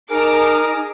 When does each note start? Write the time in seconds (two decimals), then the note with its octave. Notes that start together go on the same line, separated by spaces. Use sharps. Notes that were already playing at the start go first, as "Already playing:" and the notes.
0.10 D#4 G#4 A#4 A5 A#5 D6